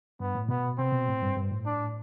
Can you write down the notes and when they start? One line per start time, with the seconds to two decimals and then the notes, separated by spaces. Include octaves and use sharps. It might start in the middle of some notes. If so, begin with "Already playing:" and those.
0.20 G2 B3
0.35 A2
0.49 B2 B3
0.78 C3 C4
0.92 B2
1.08 A2
1.22 G2
1.37 G2
1.52 A2
1.66 D4